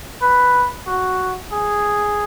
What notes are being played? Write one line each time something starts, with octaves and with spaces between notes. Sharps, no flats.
B4
F#4
G#4